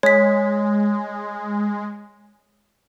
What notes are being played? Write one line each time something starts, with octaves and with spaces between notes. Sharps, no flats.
G#3 C#5 B6